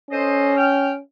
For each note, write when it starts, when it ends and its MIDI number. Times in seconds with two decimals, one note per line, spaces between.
0.10 1.00 61
0.10 0.52 69
0.10 0.52 72
0.10 0.52 75
0.56 0.89 79
0.56 0.89 89